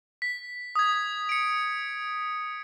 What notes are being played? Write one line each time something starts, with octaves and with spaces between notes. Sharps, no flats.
B6
D#6 G#6
C#7 D7